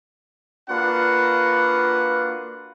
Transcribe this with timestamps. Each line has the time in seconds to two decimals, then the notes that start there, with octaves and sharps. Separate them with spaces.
0.70 A#3 D4 F4 F#4 B4 F#5